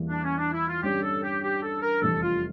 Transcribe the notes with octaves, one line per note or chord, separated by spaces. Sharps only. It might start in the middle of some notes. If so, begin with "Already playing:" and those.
Already playing: E2 E3 G3 A#3
D4
C#4
D4
E4
F4
G2 D3 G3 C#4 G4
A4
G4
G4
A4
A#4
F1 E2 E3 G3 A4
F4